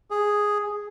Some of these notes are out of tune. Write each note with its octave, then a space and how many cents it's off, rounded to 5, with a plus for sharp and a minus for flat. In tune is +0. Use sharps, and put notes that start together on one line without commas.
G#4 +0